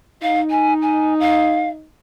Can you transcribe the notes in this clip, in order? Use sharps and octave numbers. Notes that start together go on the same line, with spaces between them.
D#4 F5
G#5
G#5
F5